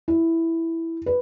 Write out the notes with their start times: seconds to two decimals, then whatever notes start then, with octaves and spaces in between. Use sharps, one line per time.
0.08 E4
1.06 B4